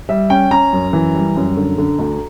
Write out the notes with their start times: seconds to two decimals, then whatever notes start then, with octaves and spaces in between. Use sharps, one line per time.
0.09 G3 E5
0.30 C#4 G5
0.51 C#4 A#5
0.73 F#2
0.93 E3
1.15 G3
1.36 F#2
1.57 D3
1.78 D3
1.99 D2